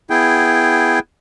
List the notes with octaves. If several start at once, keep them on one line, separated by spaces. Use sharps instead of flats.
B3 E4 G#4 G5